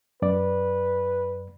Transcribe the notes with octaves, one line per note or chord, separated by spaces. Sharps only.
F#2 B4 D5